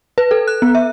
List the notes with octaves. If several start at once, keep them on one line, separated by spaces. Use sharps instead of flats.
B4
A4
F#6
B3
E5